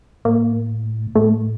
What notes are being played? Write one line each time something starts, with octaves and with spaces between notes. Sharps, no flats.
A2 A#3
A2 A3